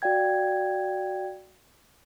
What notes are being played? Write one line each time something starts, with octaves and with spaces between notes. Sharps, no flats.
F#4 D5 F5 G5 G#6